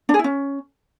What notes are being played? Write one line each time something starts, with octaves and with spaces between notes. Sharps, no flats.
D4
G#4
E4
C#4